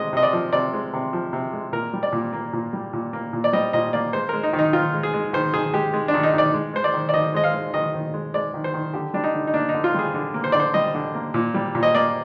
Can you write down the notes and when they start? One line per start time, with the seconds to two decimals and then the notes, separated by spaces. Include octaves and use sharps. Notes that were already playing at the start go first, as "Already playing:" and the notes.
Already playing: C3 G#3 D#5
0.13 C3 D#5
0.23 D5
0.33 F3
0.53 C3 D5
0.73 G#3
0.93 C3
1.13 F3
1.33 C3
1.53 G#3
1.73 A#2 A#4
1.93 G3
2.03 D5
2.13 A#2
2.33 A#3
2.53 A#2
2.73 G3
2.93 A#2
3.13 A#3
3.33 A#2
3.44 D5
3.53 G3 D#5
3.73 A#2 D#5
3.93 A#3 D5
4.13 G#3 C5
4.29 G#3 A#4
4.43 D#4
4.53 D#3
4.59 D#4
4.73 D#3 F4
4.93 G#3
5.03 G#4
5.14 G#3
5.33 D#3 C5
5.53 D#3 G#4
5.73 G#3 G4
5.94 G#3
6.08 D4
6.14 D#3
6.23 D#4
6.33 D#3 D5
6.54 G#3
6.74 G#3 C5
6.84 D5
6.94 D#3
7.09 D5
7.14 D#3 D#5
7.34 G#3 D#5
7.44 F5
7.54 G#3
7.74 D#3 D#5
7.94 D#3
8.14 G#3
8.34 G#3 D5
8.54 D#3
8.64 C5
8.74 D#3
8.94 D3 G4
9.14 G3 D4
9.24 D#4
9.34 D3
9.47 D#4
9.54 A#3 D4
9.69 D#4
9.74 D3
9.84 F4
9.94 G3 G#4
10.14 D3
10.34 A#3
10.44 C5
10.52 D3 D5
10.60 C5
10.74 G3 D#5
10.95 D3
11.15 A#3
11.34 A#2
11.54 G3
11.75 A#2
11.83 D#5
11.94 A#3 D5